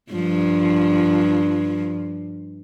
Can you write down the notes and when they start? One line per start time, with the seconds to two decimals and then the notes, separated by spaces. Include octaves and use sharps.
0.11 G2 F3